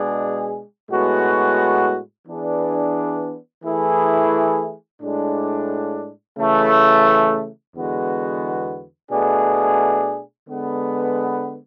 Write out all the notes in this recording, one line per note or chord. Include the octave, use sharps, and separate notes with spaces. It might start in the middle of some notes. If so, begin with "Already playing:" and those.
Already playing: B2 G#3 D4 G#4
A2 G#3 B3 F#4
E3 B3 D4 G#4
E3 A3 E4 G#4
A2 G#3 D4
C#3 E3 A3
E2 D3 G#3 B3 F#4
B2 A3 D4 G#4
D3 G#3 B3